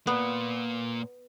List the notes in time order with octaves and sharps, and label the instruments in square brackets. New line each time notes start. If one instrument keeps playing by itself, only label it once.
[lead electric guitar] A#2 A#3 [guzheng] B3